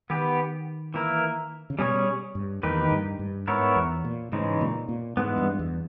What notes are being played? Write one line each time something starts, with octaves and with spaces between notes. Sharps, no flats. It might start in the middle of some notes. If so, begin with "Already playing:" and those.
D#3 B3 G4 B4
E3 A#3 E4 A#4
C#3
B2 G3 C#4 G#4 C#5
G2
E2 D#3 A#3 D#4 G4 B4
G2
G2
G#2 B3 E4 A#4 C#5
E2
A#2
G#2 C#3 E3 G#3 D#4
A#2
A#2
G#2 E3 G#3 B3
G2
E2